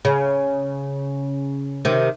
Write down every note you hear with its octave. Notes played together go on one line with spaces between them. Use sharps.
C#3
C3 D#3